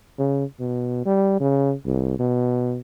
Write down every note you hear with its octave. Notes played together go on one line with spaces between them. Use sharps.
C#3
B2
G3
C#3
C2
B2